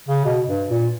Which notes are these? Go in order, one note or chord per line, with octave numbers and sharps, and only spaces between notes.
C#3
B2
G2
A#2